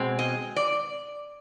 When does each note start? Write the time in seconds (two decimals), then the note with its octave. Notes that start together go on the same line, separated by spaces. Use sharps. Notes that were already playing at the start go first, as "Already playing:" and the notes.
Already playing: B2 G#3 C4
0.19 D#5
0.56 D5